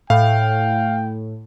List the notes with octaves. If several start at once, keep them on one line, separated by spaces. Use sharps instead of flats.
A2 F5 G5